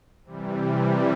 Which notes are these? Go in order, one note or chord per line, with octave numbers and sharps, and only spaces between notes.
C3 E3 G3